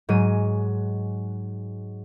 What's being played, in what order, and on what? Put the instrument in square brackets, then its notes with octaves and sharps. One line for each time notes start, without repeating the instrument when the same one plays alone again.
[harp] G#2 F#3 G#3 D#7